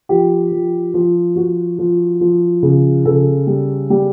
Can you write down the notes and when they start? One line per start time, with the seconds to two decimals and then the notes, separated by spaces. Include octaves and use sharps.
0.09 F3 G4
0.52 F3
0.94 F3
1.36 F3 F#4
1.79 F3
2.21 F3
2.63 C#3
3.05 C#3 A4
3.47 G3
3.90 G3